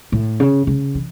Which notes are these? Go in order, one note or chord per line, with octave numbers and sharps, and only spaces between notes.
A2
C#3
C#3
E3